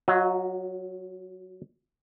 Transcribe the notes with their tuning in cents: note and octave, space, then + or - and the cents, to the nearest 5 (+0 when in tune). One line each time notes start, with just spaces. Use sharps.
F#3 +0 F#4 -45 D#5 +0